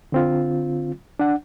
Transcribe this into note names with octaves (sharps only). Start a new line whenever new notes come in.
D3 C4 F4
D4 F#5